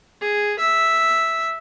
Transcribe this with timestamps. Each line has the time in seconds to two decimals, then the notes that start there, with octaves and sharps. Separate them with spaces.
0.21 G#4
0.59 E5